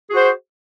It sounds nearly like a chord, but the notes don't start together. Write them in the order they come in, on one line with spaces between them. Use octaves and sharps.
G#4 F#4 C5